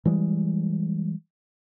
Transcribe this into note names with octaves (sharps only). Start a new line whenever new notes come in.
E3 G3 G#3